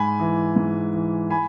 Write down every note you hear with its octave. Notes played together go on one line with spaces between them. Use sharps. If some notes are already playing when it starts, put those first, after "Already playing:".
Already playing: G#2 G#5 B5
E3
G#2
E3
G#5 B5